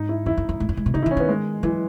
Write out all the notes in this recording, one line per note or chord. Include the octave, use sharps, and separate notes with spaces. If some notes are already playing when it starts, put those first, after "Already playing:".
Already playing: G#2 D#4
E4
E2 E4
F#2
F#2
G#2
F#2
G#2
B2
C#3 D#4
E4
D#3
C#4
D#3 B3
G#3
E3 F#3